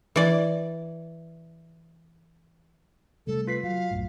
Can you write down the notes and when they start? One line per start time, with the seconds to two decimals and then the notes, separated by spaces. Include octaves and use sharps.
0.16 E3 D5
3.27 C3 G3 A3 A4
3.47 F4 B4 B6 C7
3.63 F#3 F5
3.91 B1 F#2 A2